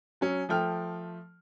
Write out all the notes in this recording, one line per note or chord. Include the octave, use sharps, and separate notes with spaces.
F#3 C#4
F3 A3 G5 F6